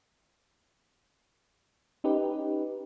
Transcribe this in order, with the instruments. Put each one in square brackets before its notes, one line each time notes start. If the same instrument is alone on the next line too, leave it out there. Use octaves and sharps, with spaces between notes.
[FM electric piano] C#4 D#4 G4 B4